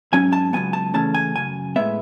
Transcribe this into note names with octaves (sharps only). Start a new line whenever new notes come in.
G#2 F#3 C#4 G#5
A5
C#2 C#3 F#3 B3 G#5
A5
C#3 E3 A3 C#4 A5
G#5
F#2 C#3 G#5
A2 G#3 B3 E5